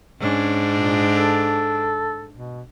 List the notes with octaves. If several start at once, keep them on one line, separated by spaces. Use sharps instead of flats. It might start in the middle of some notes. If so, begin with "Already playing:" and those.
G#2 C#4 D4
A#2
A4
B2